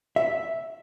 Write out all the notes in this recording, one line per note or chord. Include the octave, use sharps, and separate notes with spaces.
E5